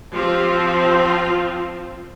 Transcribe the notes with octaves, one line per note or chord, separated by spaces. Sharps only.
F3 C4 F4 G4
F4